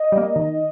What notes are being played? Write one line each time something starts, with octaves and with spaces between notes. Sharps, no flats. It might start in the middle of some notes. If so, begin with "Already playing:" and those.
Already playing: D#5
G3
A#3
D#3